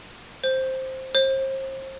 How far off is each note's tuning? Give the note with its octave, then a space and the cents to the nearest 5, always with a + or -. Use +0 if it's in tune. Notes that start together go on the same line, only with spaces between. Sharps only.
C5 +5
C5 +35